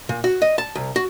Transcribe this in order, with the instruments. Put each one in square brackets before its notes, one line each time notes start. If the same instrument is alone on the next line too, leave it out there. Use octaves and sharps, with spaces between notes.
[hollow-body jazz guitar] A#2
F#4
D#5
A5
C2
F#4